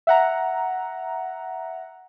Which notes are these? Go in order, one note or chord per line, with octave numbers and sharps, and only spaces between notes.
E5 F#5 A#5